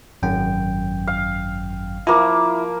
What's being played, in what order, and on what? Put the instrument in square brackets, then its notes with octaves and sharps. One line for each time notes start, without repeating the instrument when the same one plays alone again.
[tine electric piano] G#1 F#2 G5
[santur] F5
[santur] F3 A#3 D6 [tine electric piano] E4